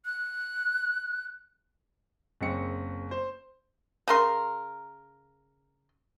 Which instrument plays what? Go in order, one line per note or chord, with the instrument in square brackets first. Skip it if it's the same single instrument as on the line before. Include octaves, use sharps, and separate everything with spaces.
[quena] F#6
[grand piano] F#1 F#2 G#3 C4 C#7
C5
[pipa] C#3 A#4 C6